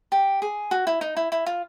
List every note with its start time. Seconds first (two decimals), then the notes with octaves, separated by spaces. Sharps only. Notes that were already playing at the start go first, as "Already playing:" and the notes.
0.12 G4
0.42 G#4
0.71 F#4
0.87 E4
1.01 D#4
1.17 E4
1.32 E4
1.46 F4